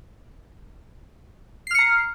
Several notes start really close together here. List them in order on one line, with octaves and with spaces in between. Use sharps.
C7 F6 C#7 A#5